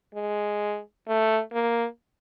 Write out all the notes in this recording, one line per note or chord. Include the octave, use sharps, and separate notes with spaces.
G#3
A3
A#3